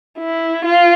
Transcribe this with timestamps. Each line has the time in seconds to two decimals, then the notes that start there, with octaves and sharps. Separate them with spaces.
0.19 E4
0.65 F4